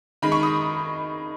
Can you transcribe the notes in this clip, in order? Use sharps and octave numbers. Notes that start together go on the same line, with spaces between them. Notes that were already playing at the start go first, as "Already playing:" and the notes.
D#3 G#3 D#4 B5
C#6
D#6